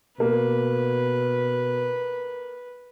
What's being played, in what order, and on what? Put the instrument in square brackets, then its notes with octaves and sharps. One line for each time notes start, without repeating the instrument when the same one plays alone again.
[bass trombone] B2 [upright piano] A#3 [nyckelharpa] B4